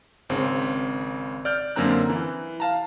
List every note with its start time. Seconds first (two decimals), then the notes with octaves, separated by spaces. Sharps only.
0.29 G#1 C#3 C4
1.45 D5 F6 G6
1.76 F#2 D3 A#3 C4 A#5 F#6
2.09 E3
2.60 F5 A5 A#5